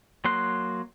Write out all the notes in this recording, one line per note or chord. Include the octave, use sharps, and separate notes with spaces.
F#3 A#3 C6 F#6